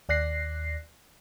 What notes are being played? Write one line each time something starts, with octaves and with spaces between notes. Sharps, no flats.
D#2 D5 F#6 A#6 C7